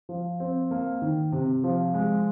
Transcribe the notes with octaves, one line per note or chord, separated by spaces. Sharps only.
F3
C4
A#3
D#3
C3
F3
G#3